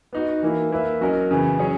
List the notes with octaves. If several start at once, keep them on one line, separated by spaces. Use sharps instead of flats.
B3 D#4 F#4
E3 A#3 E4
A#3 E4 B4 E5
F#3 C#4 F#4 A#4 D#5
C#3 E3 B3
F#3 C#4 G#4 C#5